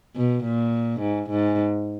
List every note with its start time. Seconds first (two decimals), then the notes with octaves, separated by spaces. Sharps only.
0.16 B2
0.45 A#2
1.01 G#2
1.31 G#2